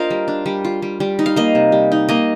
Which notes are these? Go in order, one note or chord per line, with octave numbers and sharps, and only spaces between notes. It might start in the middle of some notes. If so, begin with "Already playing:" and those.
Already playing: D4 F4 A#4 C5 D#5 F5
G3
D4
G3
F4
G3
G3
D#4
F5
A#3 D#5
C3
G3
D#4
A#3 D#5